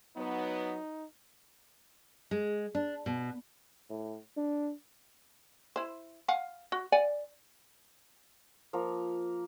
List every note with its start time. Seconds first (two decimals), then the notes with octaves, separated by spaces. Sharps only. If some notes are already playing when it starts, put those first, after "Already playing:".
0.17 F#3 B3 D#4
2.31 G#3
2.75 D4
3.06 B2
3.90 A2
4.37 D4
5.76 E4 C5
6.28 F5 F#5 G#5
6.72 F#4
6.92 D5 F#5 G#5
8.73 F3 A#3 A#5